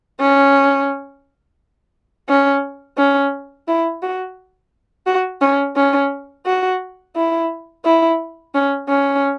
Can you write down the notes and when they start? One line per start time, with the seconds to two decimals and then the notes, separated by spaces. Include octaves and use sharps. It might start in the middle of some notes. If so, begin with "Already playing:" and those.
0.20 C#4
2.29 C#4
2.98 C#4
3.68 E4
4.03 F#4
5.07 F#4
5.41 C#4
5.76 C#4
6.46 F#4
7.16 E4
7.85 E4
8.55 C#4
8.89 C#4